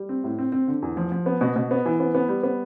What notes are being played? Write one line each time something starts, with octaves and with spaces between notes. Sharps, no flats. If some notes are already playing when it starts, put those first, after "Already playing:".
Already playing: G3
C4
A2
C4
C4
D3
E2
F3
F3
B3
B2
B2
B3
E3
B3
B3
G3
B3